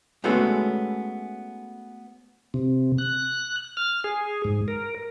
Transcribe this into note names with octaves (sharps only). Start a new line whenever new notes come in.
G#3 A3 B3 C#4 F#4 A4
C3
F#6
F6
G#4
G#2
A#4